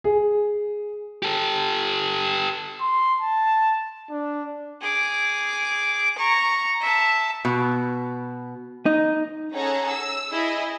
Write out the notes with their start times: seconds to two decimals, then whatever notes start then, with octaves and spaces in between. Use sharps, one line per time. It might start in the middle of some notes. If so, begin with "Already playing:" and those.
0.04 G#4
1.23 G4 A4
2.80 C6
3.21 A5
4.10 D4
4.81 G#4 D6
6.17 A#5 C#6
6.81 E5 A5
7.45 B2
8.86 D#4
9.53 C#4 G#4 A4 F#5 A#5
9.90 E6
10.32 E4 G#4 D#5